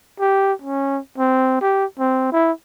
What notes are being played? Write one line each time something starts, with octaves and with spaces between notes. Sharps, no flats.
G4
C#4
C4
G4
C4
E4